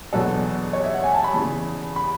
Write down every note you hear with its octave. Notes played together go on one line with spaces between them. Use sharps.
E2 B2 F#3 B3 D4 A4
C#5
E5
F#5
G#5
A5
B5
E2 C#3 E3
B5